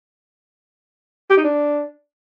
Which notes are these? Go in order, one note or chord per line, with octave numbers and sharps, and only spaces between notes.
G4
D#4
D4